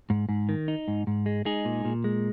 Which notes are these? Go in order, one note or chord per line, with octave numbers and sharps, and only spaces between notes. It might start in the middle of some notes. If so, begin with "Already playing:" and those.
G#2
G#2
D#3
D#4
G#2
G#2
G#3
G#3 D#4 G#4
A#2
A#2
G#3